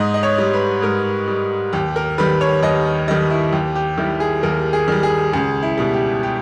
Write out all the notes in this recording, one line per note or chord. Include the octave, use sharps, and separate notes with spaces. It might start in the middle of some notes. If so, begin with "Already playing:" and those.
Already playing: G#2 D#5
D#5
C#5
G3
B4
G#2 A#4
G3
D#2 G4
A#4
D#3 G3 B4
C#5
D#2 D#5
D#3 G3 D#5
E4
D#2 G4
G4
D#3 G3 E4
G#4
D#2 A#4
G#4
D#3 G3
G#4
C#2 G#4
E4
B2 G3
G4
G4